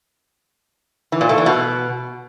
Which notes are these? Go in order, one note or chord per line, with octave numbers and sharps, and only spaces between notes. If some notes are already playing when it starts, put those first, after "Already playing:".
E3
A#2
A3
E3
B2